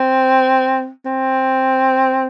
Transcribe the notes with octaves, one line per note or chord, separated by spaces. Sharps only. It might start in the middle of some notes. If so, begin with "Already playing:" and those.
Already playing: C4
C4